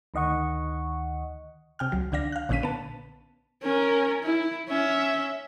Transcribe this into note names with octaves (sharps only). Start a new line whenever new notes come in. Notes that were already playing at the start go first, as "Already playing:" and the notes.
D2 D#3 D#5 F#5 C#6
C3 G5 F6
C#2 F#3
C#2 D3 D4 F5 A#6
F5 F#6
A#1 A#2 D3 C#4 B6 D#7
B3 A5
C#4 A#4
E4
C#4 E5